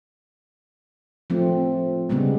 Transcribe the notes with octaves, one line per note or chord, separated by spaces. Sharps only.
F3 A3 C4
C#3 G3 G#3 B3